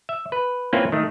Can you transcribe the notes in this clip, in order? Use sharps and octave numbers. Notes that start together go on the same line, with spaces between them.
E5
B4
A#3 C4 C#4 E4 F4 B4
D#3 A3